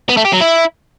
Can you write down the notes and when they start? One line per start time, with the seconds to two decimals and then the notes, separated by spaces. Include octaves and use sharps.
0.09 B3
0.17 A3
0.25 G4
0.33 F#3
0.41 E4